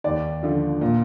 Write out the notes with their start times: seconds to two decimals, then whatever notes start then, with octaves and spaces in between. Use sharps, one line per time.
0.04 D#2 D5
0.43 D3 F3
0.81 A#2